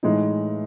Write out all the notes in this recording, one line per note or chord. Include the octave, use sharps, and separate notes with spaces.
A2 E3 G#3 D#4